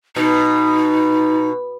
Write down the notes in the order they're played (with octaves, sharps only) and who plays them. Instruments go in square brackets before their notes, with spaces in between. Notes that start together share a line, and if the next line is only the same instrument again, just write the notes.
[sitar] B2 [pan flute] D#4